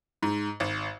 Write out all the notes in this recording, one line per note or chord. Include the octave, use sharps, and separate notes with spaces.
G#2
G#1